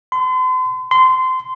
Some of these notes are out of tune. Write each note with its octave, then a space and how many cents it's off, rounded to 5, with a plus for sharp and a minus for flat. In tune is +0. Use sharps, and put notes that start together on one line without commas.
C6 -40
C6 -20